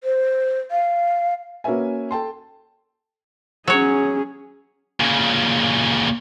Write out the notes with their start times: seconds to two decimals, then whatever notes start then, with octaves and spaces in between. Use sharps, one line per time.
0.04 C5
0.71 F5
1.64 A#3 C#4 F#4 B4 E5 G#5
2.11 A4 G5 A5 C6
3.68 F#3 C#4 G#4 C#5
5.00 A#2 C#3